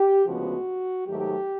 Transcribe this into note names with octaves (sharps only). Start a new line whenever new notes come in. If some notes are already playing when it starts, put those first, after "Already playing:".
Already playing: G4
D2 C#3 F3 G#3 B3 F#4
G#2 D#3 F#3 A3 G4